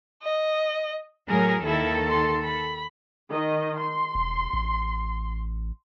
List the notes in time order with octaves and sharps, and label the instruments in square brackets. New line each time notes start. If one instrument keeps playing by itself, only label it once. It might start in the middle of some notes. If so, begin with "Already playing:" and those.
[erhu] D#5
[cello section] A2 F#3 A#4 [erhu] G#4
[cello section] D#2 D#3 A4 [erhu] E4
[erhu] C6
B5
[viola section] D#3 D#5
C6
[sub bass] E1
A1